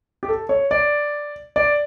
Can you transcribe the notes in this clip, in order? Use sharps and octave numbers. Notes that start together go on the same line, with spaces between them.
G4
A4
C#5
D5
D5